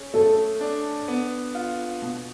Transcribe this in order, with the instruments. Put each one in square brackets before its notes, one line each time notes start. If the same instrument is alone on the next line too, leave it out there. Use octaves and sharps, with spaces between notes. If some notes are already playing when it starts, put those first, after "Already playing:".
Already playing: [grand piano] C#4 G#4
[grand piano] A3 [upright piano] A4
[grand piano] D4
B3
F4
B2